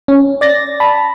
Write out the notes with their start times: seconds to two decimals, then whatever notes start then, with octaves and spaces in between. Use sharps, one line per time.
0.08 C#4
0.41 D5 A6 A#6
0.80 A5 B5